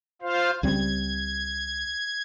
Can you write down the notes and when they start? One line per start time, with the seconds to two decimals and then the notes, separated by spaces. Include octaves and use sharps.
0.22 F4 C5 F5
0.63 C#2 G3 C4 G#6